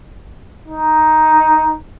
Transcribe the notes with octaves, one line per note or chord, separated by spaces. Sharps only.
D#4